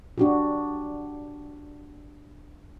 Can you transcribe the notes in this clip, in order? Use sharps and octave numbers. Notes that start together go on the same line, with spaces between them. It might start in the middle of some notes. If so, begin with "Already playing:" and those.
D4 F#4 G4